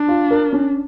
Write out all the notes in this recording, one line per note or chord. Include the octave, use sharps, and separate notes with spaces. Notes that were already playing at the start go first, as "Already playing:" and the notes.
Already playing: D4
F4
A#4
C#4